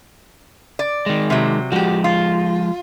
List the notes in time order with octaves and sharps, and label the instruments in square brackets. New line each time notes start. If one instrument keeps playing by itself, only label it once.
[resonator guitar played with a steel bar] D5
[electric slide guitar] D#3 G#3
[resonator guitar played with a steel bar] C3 F#3
[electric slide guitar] F3 G#3 [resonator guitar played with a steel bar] F#4 G4
[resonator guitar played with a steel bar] F4